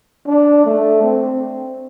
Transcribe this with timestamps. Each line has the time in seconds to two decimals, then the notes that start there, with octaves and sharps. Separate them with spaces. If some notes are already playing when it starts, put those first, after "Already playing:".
0.27 D4
0.65 A3
1.03 C4